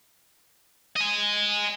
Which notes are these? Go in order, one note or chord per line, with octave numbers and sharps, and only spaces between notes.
D#5 G#5